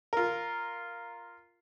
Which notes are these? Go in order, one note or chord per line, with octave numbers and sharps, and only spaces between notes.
F4 A#4